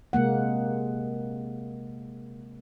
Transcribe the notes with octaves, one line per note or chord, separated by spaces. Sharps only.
C3 G#3 A#3 F#5